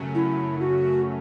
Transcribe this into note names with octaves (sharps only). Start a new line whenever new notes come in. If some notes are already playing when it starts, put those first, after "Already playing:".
Already playing: F#2 C#3 F#3 A3 C#4
E4
F#4